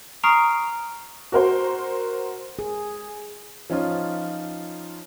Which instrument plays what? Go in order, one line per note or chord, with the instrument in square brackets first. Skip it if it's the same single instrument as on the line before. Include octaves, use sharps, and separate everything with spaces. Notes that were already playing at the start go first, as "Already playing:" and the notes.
[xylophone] A#5 C#6 D#6 F6 C7 D7
[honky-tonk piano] F#4 A#4 C5
[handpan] G#4
[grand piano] F3 C#4 D#4 F4